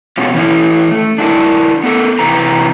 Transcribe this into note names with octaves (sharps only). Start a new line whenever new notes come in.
B2 B3 C#4 F4
E3 C#4 E4
A3
D4 E4 F4 A#4
B3 A4 A#4
C3 E3 B4 A#5